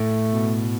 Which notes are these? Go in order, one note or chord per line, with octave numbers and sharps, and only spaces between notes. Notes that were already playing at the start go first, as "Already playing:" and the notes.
Already playing: A2 A3
B2